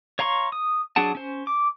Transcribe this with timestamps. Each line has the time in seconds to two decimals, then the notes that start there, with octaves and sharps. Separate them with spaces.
0.19 C#5 F5 A#5 C6 C#6
0.52 D#6
0.96 F#3 D4 G#4 F#5 A5
1.15 C#4 C5
1.47 D6